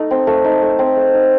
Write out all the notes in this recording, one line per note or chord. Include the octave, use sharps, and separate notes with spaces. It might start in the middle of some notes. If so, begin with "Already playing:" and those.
Already playing: A3 D#4
C4
A3
D#4
A3
C4
A3
D#4